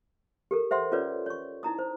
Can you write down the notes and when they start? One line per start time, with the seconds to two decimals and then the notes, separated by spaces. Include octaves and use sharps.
0.51 G4 A4 A#4
0.71 C5 E5 F#5 C6
0.92 C#4 F4 A4 B4 C#5 D5
1.26 C#5 C#6
1.63 D#4 E4 A#5 D#6
1.79 C5